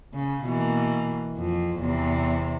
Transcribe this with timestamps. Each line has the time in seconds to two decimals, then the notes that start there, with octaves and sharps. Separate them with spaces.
0.13 C#3
0.43 B2 E3 A#3
1.37 F2
1.79 E2 C3